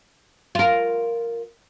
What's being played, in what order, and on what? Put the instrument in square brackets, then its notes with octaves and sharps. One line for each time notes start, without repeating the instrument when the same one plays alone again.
[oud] F4 A#4